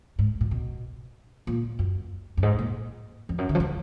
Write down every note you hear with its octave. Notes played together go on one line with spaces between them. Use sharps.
G#2
A#2
B2
A#2
F#2
F#2
G#2
A#2
F2
F#2
D#3
F3
F#3